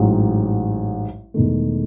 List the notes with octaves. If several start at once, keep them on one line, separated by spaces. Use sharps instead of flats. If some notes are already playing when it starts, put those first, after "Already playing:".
Already playing: A1 G#2 F#3
E1 E2 D#3 A3